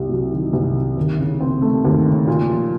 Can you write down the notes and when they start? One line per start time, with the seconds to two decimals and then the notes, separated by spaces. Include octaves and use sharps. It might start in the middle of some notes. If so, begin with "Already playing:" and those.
Already playing: C2 C3
0.09 F#3
0.32 D#3
0.53 C2
0.75 C3
0.97 D#2
1.19 C#3
1.41 C4
1.62 A3
1.85 D#2
2.06 C#3
2.27 A#2
2.50 F3